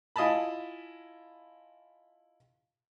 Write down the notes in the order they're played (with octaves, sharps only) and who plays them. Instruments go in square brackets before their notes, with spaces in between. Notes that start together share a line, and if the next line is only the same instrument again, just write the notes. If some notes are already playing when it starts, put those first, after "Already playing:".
[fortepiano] E4 F4 D#5 G#5 A5 B5